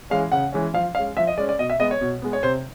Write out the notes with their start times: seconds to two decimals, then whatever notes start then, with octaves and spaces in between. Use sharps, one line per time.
0.10 E3 G#3 C#4 F5
0.32 C#3 F#5
0.52 E3 G#3 C#4
0.74 F3 F5
0.95 G#3 C#4 F5
1.17 F3 E5
1.27 D#5
1.37 G#3 C#4 D5
1.49 D5
1.59 B2 D#5
1.70 E5
1.79 G#3 B3 D#5
1.91 C#5
2.01 B2
2.22 G#3 B3
2.33 C#5
2.43 C3 C5